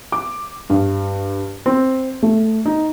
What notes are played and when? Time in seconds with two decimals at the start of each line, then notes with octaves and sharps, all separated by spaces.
0.12 D6
0.70 G2
1.66 C4
2.23 A3
2.65 D#4